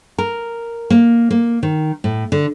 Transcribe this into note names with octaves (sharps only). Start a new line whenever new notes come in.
A#4
A#3
A#3
D#3
A2
D3